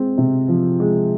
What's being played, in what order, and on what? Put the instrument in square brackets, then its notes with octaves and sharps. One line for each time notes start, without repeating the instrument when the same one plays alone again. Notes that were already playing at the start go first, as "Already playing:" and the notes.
Already playing: [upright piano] G#3 C4
C3
F3
G#3